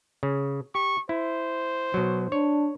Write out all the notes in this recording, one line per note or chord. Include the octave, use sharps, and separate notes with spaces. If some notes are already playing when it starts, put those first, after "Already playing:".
C#3
G4 C#6
E4 C5
B2 F#3
D4 C#5